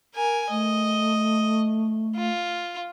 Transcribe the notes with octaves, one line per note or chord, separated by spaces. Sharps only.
A#4 G#5
A3 D#5
F4